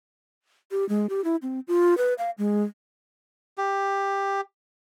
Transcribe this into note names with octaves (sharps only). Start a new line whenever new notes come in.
G4
G#3
G4
E4
C4
F4
B4
F5
G#3
G4